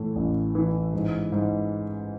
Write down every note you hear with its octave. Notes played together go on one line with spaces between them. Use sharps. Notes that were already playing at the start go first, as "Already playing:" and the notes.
Already playing: A2 E3
A1
E3
G#2
G#2